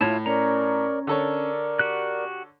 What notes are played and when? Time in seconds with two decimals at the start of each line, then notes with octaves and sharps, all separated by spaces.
0.01 A2 E4 F4 C#5 A5
0.26 C#4 A#4 C#5 D5 A#5
1.07 D3 A4 A#4 C#5 D5
1.79 F#4 G4 F#6